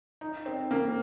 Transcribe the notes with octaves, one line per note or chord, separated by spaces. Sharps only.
D#4
C4
A#3